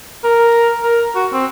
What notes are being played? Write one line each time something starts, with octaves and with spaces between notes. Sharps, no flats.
A#4
A#4
F#4
C4